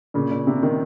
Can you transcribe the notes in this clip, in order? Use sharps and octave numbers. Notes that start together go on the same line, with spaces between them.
A#2 C#3
A#2
C3
C3 D#3